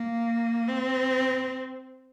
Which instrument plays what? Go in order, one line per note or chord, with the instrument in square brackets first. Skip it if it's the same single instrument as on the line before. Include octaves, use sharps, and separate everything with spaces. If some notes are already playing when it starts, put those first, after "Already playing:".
Already playing: [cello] A#3
C4